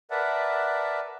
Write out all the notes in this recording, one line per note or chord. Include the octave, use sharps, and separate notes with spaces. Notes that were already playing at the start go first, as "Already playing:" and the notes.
A#4 B4 D5 E5 F#5 A5